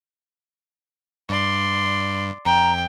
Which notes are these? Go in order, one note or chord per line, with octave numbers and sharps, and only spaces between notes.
G2 D5 C6
F2 G5 A#5